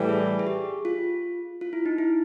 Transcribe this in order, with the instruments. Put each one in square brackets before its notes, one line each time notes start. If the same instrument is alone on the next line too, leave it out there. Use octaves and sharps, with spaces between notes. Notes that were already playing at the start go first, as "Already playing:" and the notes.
Already playing: [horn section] A2 E3 G3
[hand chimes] G#4
G#4
G4
F4
F4
E4
D#4
E4